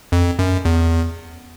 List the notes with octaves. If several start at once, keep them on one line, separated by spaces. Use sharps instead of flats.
F2
F#2
E2